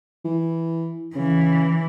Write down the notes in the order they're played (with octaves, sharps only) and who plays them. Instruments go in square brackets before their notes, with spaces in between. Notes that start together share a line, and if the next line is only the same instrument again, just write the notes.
[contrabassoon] E3
[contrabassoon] C#3 [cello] E3